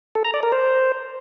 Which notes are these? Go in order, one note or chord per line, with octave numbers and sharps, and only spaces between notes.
A4
A#5
D5
A#4
C5